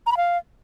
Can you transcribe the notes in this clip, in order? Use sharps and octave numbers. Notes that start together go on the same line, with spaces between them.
A#5
B5
F5